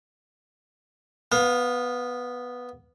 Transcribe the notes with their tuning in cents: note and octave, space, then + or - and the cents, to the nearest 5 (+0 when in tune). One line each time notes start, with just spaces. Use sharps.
B3 +0 F5 +25